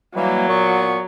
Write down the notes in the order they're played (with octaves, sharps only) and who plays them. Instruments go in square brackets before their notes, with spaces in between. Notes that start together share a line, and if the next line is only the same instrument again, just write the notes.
[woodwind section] E3 G3 A#3 [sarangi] F#3
[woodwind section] A#2 B3 C#6